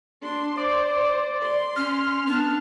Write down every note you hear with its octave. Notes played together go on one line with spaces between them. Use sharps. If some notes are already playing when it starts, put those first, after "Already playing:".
D4 C6
C5 D5
C6
C#4 F6
B3 D4 A5